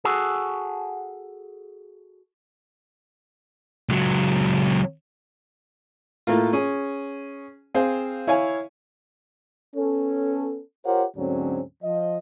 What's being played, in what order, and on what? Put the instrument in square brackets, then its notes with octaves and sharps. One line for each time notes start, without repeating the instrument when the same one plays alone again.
[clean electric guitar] F#4 G#4 A4
[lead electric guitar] C#2 F#3
[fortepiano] A2 A3 A#3 F4
C#4 G#4
C4 G#4 C5 F5
E4 C#5 F5 G#5
[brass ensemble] B3 C#4 A4
F4 G4 A#4 C5 C#5 F#5
D2 G#2 D3 F#3 C4 C#4
F3 D#5